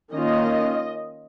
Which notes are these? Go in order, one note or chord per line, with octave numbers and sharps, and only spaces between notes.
D#3 A#3 C#4 F4 D#5